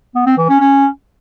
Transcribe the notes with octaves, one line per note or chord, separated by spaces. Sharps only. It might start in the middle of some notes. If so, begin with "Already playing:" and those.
B3
C4
E3
C#4
C#4